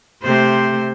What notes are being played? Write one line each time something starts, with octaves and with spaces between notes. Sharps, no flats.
C3 A3 C5